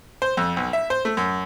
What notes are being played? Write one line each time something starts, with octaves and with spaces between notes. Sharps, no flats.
C5
F2
B1
E5
C5
A3
F#2